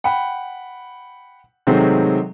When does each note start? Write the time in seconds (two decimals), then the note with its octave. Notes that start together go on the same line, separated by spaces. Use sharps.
0.04 F#5 G5 B5
1.67 C3 D#3 F#3 G#3 A3 C4